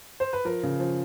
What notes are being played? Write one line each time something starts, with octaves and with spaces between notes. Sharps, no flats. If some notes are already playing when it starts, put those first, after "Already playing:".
C5
B4
F3 A#4
C#3
F3